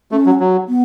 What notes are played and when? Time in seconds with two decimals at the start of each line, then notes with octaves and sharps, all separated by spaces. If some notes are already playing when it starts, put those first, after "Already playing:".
0.12 A3 C#4
0.26 F#3
0.40 F#3
0.69 B3